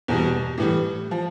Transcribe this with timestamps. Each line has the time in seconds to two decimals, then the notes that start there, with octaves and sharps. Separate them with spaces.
0.08 E2 B2 G3
0.58 A2 E3 G3
1.11 F3